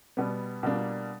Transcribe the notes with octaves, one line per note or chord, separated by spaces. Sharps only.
B2 G3 B3
B2 G3 A#3 D4 F4